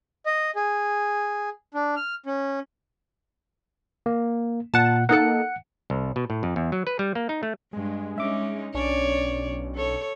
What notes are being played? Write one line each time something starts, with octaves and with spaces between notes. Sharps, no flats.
D#5
G#4
D4
F6
C#4
A#3
A#2 F#5 A5
A#3 D#4 A4 F#5 C#7
C2
B2
A2
F2
E2
F#3
B4
G3
A#3
D#4
A3
G2 G#3
C#4 D#4 E5 D6
B1 C#4 D4 C#5 D5
A4 C#5